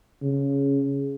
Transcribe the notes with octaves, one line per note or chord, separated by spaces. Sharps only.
C#3